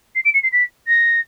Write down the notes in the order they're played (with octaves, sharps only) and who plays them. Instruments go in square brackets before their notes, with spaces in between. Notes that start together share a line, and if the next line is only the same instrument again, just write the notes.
[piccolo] C7
D7
C#7
C7
B6
A#6